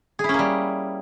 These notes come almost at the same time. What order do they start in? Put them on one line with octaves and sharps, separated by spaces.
G#4 E4 C#4 A#3 G3